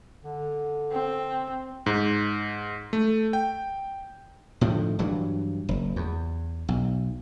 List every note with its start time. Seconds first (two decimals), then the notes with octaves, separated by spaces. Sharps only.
0.24 D3
0.92 C4
1.86 G#2
2.93 A3
3.33 G5
4.61 A2 D3 D#3 F3
4.99 G2 E3 F#3
5.69 F#1
5.96 E2
6.68 B1